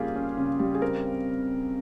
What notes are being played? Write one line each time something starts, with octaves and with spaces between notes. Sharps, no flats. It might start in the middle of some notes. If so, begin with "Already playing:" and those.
Already playing: C#3 G3 A#3 C#4 F4 G4 G#4
C#4
C#3
G3
G#4
C4 A#4